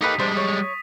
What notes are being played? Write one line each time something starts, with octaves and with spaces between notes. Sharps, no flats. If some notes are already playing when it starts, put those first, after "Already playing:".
A#3 D#4 G4 A4 B4 D#6 B6 D#7
G3 G#3 D4 C5 A6
C#5